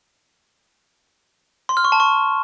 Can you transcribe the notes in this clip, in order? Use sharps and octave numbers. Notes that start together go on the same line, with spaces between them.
C6
F6
C#6
A5
C#6